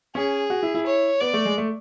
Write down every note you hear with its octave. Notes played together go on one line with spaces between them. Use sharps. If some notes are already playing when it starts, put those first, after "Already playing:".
C#4 G#4
F#4
E4
E4
C#5
B3 D5
A3
G#3
A3